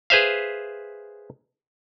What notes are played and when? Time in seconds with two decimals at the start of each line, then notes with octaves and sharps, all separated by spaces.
0.10 G#4 B4 C5 E5 F5